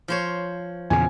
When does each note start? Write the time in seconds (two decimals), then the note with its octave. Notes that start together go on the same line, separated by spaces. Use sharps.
0.08 F3 C5 C#5
0.90 E2 A#2 C#3 G#5